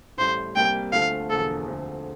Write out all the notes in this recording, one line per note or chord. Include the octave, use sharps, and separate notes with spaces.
A1 A2 G3 C5
C2 C3 G3 A#3 G5
D2 D3 A3 C4 F4 F5
E1 E2 D3 F3 A#3 A4
D2 D3 F3 C4